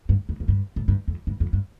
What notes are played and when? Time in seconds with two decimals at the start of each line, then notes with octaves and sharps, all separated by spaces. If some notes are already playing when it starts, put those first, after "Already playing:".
0.09 G2
0.29 F2
0.40 F2
0.48 G2
0.76 A2
0.88 G2
1.08 F2
1.27 G2
1.40 F2
1.53 G2